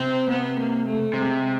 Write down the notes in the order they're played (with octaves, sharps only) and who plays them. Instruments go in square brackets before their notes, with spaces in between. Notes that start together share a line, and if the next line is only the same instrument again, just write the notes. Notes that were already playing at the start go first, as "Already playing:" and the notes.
Already playing: [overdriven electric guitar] C3 [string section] C4
[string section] B3
A#3
A3
[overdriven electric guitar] C3 [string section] G#3